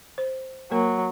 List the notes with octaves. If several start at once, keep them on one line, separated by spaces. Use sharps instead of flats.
C5
F#3 A#3 A#4